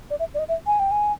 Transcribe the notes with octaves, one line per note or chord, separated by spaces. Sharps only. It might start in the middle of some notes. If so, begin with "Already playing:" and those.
D5
E5
D5
D#5
E5
G#5
G5
G#5